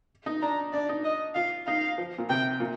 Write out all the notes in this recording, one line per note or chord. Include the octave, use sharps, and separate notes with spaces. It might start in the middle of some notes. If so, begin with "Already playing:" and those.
D#4
D4 A#5
D4 D5
D#4
D#5
F4 F5
D#4 F5
F3
A#2
C3 G5
A#2